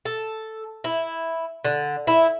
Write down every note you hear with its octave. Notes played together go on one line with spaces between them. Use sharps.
A4
E4
D3
E4